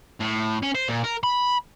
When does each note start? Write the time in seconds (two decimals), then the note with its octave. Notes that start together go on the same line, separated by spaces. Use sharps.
0.20 A2
0.62 C#4
0.75 C5
0.89 A#2
1.04 A#4
1.24 B5